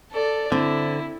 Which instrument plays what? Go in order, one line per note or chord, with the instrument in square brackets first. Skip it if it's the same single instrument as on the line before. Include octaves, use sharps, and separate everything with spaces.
[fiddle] A4 D5
[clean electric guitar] D3 [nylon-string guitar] C4 [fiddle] E4